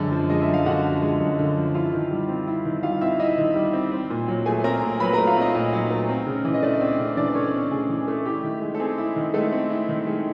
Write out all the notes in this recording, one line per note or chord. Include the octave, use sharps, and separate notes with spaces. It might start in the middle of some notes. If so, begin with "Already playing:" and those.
Already playing: F#2 D3 G#3 A4 A5
F3
G#3 D#5
E5
F#2
F5
D3 F#4 F#5
F3
G#3
F#2
D3
F3
E4 F4 F5
D#3
G3
C4
E4
D#3
G3 F4 F5
C4 E4 E5
D#4 E4 D#5
D#3
G3
C4
C4
A#2
F#3
A3 G#4 G#5
C4 A#4 A#5
A#2
F#3 B4 B5
A3 A#4 A#5
F4 F5
C4 D#4 D#5
A#2 D#4 D#5
F#3
A3
C4
C#3
E3
D#5
A3 D4 D5
C4
C#3
E3 D4 D5
A3 C#4 C#5
C4
C#3 G#4
E3
A3
E4 G4
D#3
G#3
A4
C4 G#4
E4
D#3
G#3 A3 A4
C4
E4
D#3
G#3